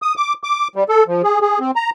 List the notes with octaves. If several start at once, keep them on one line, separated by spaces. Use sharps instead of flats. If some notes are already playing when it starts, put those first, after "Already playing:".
D#6
D6
D6
G3
A4
F3
G#4
G#4
C4
A#5